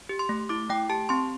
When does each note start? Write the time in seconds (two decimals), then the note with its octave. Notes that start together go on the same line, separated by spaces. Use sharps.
0.09 G4
0.19 C6
0.29 A3
0.49 E4 D6
0.70 A3 G5
0.90 G4 A5
1.09 C4 C6